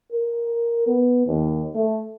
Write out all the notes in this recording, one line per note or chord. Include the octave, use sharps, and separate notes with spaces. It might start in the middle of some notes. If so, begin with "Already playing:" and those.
A#4
B3
D#2
A3